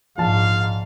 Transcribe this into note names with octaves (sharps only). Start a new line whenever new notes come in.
A#1 G#2 F5 A5